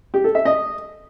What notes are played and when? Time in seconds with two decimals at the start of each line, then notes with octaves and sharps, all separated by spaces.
0.14 G4
0.24 A4
0.35 E5
0.45 D#5